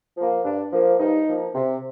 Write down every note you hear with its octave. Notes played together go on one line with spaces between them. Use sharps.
F3 A#3
G2 D4
F3 A#3
G2 D#4
F3 A#3
C3